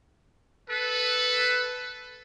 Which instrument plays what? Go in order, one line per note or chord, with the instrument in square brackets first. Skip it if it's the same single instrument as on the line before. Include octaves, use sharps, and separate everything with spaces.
[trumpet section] A4 B4